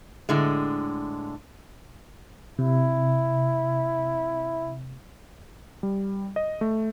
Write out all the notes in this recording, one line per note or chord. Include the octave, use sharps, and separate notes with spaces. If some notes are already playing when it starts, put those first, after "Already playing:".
A2 D3 G#3
C3 E4
G3
D#5
A3